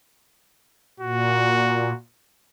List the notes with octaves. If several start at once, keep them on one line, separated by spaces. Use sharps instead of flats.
A#2 F#4